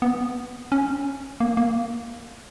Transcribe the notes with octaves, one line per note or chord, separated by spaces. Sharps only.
B3
C#4
A#3
A#3